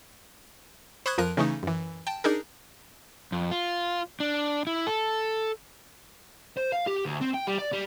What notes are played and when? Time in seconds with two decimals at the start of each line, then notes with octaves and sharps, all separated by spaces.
1.06 C5 B5 C#6 D#6 F#6 G#6
1.18 F2 F3 A#4 F#6 D#7
1.37 C#3 E3 A3 C#4 D#4
1.63 F#2 E3
2.07 G5 A5
2.24 D4 D#4 G#4 A#4
3.32 F2
3.51 F4
4.20 D4
4.67 E4
4.87 A4
6.57 C5
6.72 F5
6.87 G4
7.06 D2
7.21 C4
7.34 G5
7.48 G3
7.59 D5
7.73 G3